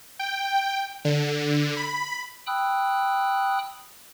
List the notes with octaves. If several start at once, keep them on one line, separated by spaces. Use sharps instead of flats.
G5
D3
B5
G5 B5 D#6 E6 F#6